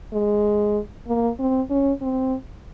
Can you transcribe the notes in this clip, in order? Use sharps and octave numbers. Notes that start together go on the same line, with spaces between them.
G#3
A#3
C4
C#4
C4